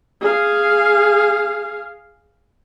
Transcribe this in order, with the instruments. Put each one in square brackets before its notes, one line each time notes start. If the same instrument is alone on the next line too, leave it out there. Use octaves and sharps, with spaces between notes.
[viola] G#4 F5